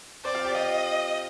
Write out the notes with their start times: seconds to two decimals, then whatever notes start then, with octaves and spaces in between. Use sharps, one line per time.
0.25 C4 C5 D5
0.35 F4 F5
0.45 G4 G5
0.55 F4 D#5 F5